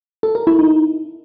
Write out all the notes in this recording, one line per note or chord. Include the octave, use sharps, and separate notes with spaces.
A4
A#4
E4
D#4